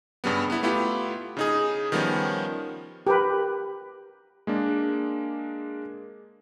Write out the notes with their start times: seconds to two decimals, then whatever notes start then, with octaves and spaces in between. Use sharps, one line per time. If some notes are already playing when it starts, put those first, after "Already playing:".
0.24 G2 C#3 G3 B3
0.50 B3 E4
0.63 A3 B3 E4 F4 G4
1.37 C#3 D#4 G#4
1.92 D#3 F3 G3 B3 C#4
3.07 G4 A#4 B4
4.47 G#3 A#3 D4